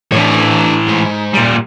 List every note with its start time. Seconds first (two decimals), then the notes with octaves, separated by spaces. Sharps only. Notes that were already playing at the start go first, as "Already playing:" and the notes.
0.12 A2 E3 D4 C#5
0.88 G#2
1.34 A#2 G3